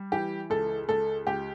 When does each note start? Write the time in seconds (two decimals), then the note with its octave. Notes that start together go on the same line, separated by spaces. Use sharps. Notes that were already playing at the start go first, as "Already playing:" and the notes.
Already playing: G3
0.12 E3 G4
0.50 C#2 A4
0.89 C#2 A4
1.27 C#2 G4